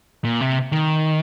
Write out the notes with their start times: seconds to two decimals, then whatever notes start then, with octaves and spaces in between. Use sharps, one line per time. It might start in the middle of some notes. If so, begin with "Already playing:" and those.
0.25 A#2
0.41 C3
0.72 D#3